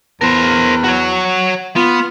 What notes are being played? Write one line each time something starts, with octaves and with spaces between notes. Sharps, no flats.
E2 A#4 C5
F#4 C#5
B3 F4